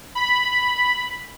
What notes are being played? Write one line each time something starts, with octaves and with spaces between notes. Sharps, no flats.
B5